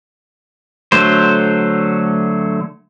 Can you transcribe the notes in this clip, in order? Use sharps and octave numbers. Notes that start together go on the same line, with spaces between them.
D3 F#3 A3 C5